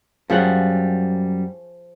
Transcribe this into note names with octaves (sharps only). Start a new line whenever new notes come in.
F#2 F3 G3 G#4 C#5 F#5